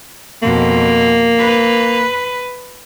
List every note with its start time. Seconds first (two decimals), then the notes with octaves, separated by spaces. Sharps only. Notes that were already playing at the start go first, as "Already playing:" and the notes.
0.43 F2 B2 A#3
1.39 B4